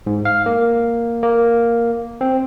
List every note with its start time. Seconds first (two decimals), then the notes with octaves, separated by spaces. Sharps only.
0.07 G#2
0.25 F5
0.46 A#3
1.23 A#3
2.21 C4